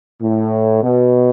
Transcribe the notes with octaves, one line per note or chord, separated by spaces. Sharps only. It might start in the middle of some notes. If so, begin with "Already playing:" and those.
A2
B2